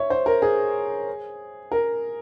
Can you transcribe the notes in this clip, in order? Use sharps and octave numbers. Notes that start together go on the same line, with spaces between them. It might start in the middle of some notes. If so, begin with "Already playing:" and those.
Already playing: C#5 E5
C5
A#4
G#4
A#4